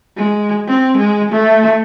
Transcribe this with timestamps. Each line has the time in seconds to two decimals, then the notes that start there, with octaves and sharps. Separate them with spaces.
0.17 G#3
0.67 C4
0.98 G#3
1.32 A3